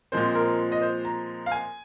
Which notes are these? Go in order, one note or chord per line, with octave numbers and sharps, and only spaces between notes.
A#2 F3 G#3 C4 C5
A#4
D#5
C5
A#5
F5
G#5